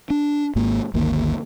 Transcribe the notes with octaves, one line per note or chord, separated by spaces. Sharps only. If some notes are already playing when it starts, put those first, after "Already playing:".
D4
G#1 G#2 A#3
G1 D2 D#3 A#3